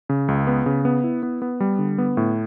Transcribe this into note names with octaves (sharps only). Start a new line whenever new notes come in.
C#3
C#2
B3
C#3
B3
E4
B3
B3
G3
D3
B3
A2